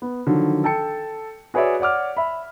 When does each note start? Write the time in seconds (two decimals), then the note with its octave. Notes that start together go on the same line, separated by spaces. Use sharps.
0.02 B3
0.27 D3 D#3 F3 F#3
0.64 A4 G5 A5 C#7
1.54 F#4 G#4 B4 C#5 D5 E5
1.80 C#5 D5 F#5 D6 F6
2.17 E5 B5